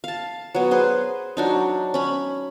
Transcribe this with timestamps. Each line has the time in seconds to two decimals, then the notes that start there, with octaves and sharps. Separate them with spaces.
0.04 F5 A5
0.55 F#3 B3
0.71 G#4 B4 C5
1.37 F#3 D4 D#4
1.94 C#4 B5